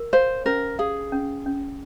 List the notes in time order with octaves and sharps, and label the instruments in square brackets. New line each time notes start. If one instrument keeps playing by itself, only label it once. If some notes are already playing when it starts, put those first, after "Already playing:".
Already playing: [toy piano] A#4
[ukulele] C5 [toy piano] F5
[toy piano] C#4 [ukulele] A#4
[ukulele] G#4 [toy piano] F5
[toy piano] C#4
C#4